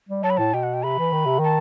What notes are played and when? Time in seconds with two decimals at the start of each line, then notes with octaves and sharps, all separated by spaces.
0.09 G3
0.23 F#3 A5
0.30 B5
0.37 A2 A5
0.54 B2 G5
0.63 F#5
0.74 G5
0.84 C3 B5
0.99 E3
1.12 D#3
1.26 C3
1.39 D#3
1.44 A5